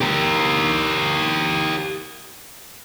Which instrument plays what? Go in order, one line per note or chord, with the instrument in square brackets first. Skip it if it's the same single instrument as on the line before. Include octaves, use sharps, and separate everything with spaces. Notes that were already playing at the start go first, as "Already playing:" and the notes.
[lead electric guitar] G4 A#4